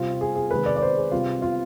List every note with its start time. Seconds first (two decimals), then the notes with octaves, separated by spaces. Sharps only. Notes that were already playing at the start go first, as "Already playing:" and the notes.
Already playing: C3 G3 C4 F4
0.21 G#4
0.36 G#4
0.51 C3 D#3 G#3 B4
0.66 D5
0.76 D5
0.82 C5
0.97 G#4
1.11 C3 G3 C4 F4
1.42 F4